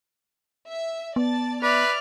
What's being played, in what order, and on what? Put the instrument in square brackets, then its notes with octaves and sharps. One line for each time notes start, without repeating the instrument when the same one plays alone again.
[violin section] E5
[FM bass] B3 [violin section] D5 A5 A6
[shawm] B4 [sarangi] D5 [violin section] E5 F6 F#6